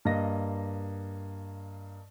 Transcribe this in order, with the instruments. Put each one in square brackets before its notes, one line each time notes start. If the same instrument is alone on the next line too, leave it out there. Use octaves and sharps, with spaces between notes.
[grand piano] G2 A#3 D#5 A#6